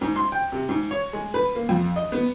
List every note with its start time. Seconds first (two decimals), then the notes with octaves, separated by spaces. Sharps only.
0.01 G#2
0.16 C6
0.32 G5
0.52 C3
0.69 G#2
0.91 C#5
1.13 G#3
1.34 B4
1.55 A#3
1.69 F2
1.96 D#5
2.12 B3